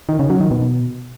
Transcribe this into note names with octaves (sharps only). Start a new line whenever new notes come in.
D#3
C#3
F#3
D#3
B2